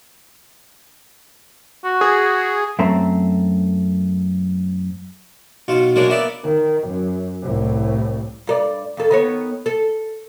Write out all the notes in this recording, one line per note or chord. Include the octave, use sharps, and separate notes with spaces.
F#4
G#4
F#2 A3 C4 A4 A#5
B1 B2 F4 C#6
F#3 G#3 A#3 D4 A#4 C#5
A#3 B3 E4 D5 E5
D#3
F#2
C2 A2
G2 A4 D5
F2 A4
D#3 B3 C#5
A4